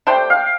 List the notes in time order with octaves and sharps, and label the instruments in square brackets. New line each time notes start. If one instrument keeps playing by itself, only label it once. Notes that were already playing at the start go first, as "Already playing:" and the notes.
[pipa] A3 D4 G4 C5 [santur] G5
[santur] F5